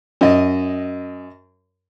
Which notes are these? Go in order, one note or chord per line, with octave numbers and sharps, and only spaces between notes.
F#2 D#5